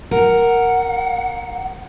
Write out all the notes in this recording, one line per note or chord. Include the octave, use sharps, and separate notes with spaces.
A#4 F#5